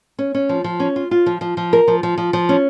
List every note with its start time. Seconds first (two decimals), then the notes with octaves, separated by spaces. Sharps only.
0.19 C#4
0.34 C#4
0.49 F3
0.64 F3
0.80 C#4
0.96 F4
1.11 F4
1.26 F3
1.41 F3
1.57 F3
1.73 A#4
1.88 F3
2.03 F3
2.18 F3
2.33 F3
2.49 C#4